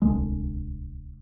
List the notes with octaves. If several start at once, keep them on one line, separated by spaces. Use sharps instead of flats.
D1 C2 D3 G#3